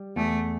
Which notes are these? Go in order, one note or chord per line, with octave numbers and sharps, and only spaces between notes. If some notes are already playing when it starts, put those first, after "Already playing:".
Already playing: G3
E2 A3